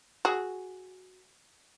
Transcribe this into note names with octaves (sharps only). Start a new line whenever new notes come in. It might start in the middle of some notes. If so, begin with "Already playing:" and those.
F#4 G#4